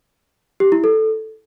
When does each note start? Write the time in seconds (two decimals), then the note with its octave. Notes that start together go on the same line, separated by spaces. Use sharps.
0.60 G4
0.72 E4
0.84 A4